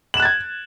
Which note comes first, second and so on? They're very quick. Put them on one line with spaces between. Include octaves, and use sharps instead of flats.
F#7 E7 F#6 A6 G#6